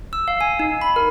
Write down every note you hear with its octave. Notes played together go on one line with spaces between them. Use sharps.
E6
F5
G#5
D#4
B5
A#4